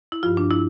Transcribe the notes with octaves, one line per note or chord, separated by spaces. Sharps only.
E4
G2 F3 F4
D4
E4